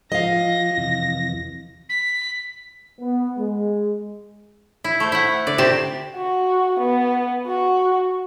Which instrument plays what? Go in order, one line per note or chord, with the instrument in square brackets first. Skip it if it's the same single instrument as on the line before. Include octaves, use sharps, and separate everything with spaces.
[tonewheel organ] F3 [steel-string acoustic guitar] D#5 F5 [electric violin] A#6
[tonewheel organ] F2 C3 E3
[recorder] B6
[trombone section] B3
G#3
[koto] E4
A3 C5
E4 F#5
[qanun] D3 [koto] D5
[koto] C3 [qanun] G4 A5 C6
[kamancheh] F#4
B3
F#4